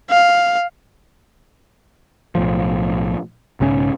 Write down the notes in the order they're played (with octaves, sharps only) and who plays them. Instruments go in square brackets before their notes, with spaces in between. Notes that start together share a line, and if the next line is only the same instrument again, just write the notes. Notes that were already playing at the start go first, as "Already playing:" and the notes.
[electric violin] F5
[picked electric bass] B1 A2 F3
B1 G#2 C#3 C#4